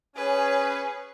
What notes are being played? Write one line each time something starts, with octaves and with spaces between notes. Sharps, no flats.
C#4 G#4 B4 C#5 G#5